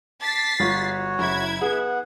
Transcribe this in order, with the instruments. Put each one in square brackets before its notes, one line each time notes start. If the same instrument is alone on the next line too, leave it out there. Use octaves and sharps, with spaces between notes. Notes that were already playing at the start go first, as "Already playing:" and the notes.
[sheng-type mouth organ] A5 D6 [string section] A6 B6 C7
[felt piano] G1 F4 [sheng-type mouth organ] F#4 C#5
[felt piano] F#1 [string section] E4 G#6
[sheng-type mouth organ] B3 F#5 [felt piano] G#4